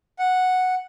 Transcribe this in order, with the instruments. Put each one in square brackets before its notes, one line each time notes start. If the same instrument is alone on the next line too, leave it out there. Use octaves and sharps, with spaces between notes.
[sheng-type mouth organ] F#5